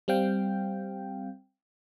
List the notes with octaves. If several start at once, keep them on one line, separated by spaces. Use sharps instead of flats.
G3 C4 F5 G5